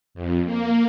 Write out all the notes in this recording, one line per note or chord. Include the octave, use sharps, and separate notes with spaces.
F2
A#3